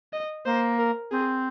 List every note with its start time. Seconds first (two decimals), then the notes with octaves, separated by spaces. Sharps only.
0.13 D#5
0.45 A#3 C5
0.79 A#4
1.11 C4 G#4